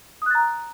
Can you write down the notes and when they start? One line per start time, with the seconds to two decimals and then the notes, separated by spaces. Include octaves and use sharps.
0.22 D#6
0.26 F#6
0.30 A6
0.35 A#5